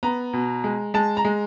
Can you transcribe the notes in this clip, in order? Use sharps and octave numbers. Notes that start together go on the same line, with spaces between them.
B3 A#5
B2
G#3
G#3 A5
A#5
G#3